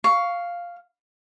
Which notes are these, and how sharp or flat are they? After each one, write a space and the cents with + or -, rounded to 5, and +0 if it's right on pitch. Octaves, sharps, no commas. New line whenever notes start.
F5 +0 C#6 +15